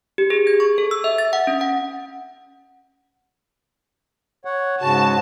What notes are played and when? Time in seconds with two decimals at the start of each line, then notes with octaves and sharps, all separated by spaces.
0.18 G4
0.30 G#4
0.47 G#6
0.60 C#6
0.78 A4
0.91 E6
1.04 E5
1.18 A6
1.33 F#5
1.47 C#4
1.61 F#5
4.45 C#5 F#5
4.82 G#2 C#3 F#4 A5